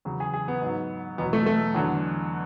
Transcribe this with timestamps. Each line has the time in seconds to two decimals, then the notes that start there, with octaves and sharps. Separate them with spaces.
0.05 E2 C#3 F#3
0.20 G#4
0.34 G#4
0.48 B3
0.61 G#2 F#3
1.18 E2 B2 F#3 B3
1.33 A3
1.46 A3
1.75 E2 D3 F#3